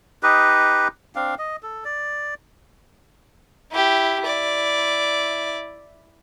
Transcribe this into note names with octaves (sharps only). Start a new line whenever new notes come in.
D#4 G4 B4 D#5
C4 D4 F5
D#5
A4
D5
E4 G4
E4 D5